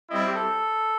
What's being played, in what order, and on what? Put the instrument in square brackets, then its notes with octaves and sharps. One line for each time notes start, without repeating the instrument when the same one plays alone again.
[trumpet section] G3 C4 E4 [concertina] D#5
[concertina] G4
A4